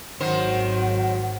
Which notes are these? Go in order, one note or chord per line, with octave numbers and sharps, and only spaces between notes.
G#1 D#3 F#3 C5 F#5